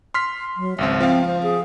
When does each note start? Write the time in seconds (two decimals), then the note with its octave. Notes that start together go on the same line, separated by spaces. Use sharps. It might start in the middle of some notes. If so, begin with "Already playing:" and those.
0.14 C6 F6 B6
0.57 F#3
0.78 G#1 C#2 C4 E5
1.00 F3 C4 F5
1.25 C5
1.43 G#4